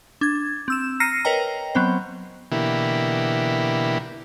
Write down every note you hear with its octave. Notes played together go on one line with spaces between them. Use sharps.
D4 G#6
C4 E6 E7
A#5 F6 A#6 C7 C#7 D#7
A#4 B4 C#5 D#5 G5 A#5
F#3 B3 C4 C5
B2 D3 E3 A#3 E4 G4